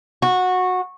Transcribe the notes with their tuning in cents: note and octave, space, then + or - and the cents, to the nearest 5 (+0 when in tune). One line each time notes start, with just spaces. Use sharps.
F#4 -15